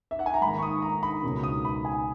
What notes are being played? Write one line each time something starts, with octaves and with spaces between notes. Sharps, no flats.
E5
F#5
G#5
A#5
G#2 D#3 A#3 B5
C#6
D#6
A#5
B5
C#2 B2 A#3 C#4
D#6
B5
G#5